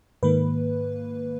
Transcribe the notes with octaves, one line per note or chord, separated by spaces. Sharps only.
G#2 D#3 A#3 B4